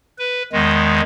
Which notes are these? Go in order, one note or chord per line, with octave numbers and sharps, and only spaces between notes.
B4
E2 D#3 G#3